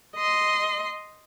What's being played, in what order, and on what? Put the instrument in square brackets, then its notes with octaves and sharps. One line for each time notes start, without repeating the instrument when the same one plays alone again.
[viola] D#5 C6